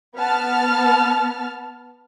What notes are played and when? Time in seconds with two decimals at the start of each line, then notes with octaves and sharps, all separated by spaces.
0.16 B3 A5 F6